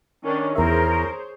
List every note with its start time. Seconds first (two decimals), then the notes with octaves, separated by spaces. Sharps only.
0.23 D#3 C#4 D4
0.55 E2 G#4 A#4 C5 C#5 E5